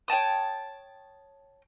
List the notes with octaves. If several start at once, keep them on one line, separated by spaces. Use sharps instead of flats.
C#5 G5 A5 D#6